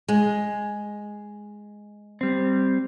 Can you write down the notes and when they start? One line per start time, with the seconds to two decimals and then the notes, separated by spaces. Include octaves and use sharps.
0.08 G#3
2.21 G3 C4